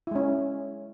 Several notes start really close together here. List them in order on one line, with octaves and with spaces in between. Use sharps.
E4 G#3 C#4